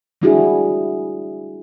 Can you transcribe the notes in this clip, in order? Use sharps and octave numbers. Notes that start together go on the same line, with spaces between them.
G3 A3 D4 E4 F#4 G#4